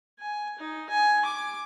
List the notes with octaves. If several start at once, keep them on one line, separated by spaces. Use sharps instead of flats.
G#5
D#4
G#5
D6